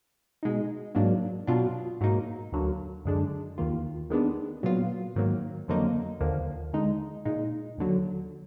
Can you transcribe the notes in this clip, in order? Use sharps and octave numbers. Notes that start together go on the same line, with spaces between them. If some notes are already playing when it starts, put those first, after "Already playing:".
B2 G#3 D#4
G#2 F#3 A#3 D4
B2 F#3 D4 F4
G#2 F#3 A#3 D#4
D2 D3 F#3 A#3
F#2 D3 G#3 D4
D#2 D#3 A#3 F4
D#2 D#3 G#3 B3 D4
A#2 F#3 B3 F4
G#2 D#3 F#3 A#3
F2 D3 F#3 A#3 D#4
D#2 D3 F3 A#3
D3 G#3 D#4
A#2 G#3 D#4
D#2 D3 F#3